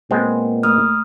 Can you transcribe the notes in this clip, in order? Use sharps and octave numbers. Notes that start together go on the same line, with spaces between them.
A#2 G#3 B3 C4
A3 D#6 F6